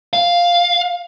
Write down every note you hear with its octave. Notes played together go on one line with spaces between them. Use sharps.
F5